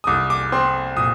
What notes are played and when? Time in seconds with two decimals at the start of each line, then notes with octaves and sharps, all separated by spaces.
0.04 D#6
0.07 C2 D6
0.30 D6
0.52 C4 C6
0.97 A#2 D#6